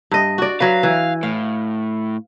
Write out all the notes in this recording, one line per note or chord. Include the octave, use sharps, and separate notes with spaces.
G2 D#5
F#4 D5
F#3 F#4 B4 F5
E3
A2 F5